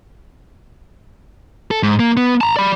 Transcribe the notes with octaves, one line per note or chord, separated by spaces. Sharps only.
A4
G#2
A#3
B3
A5 A#5
D5 B5